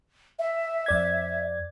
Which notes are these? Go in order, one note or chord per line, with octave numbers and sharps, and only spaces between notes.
E5
F2 D5 G#6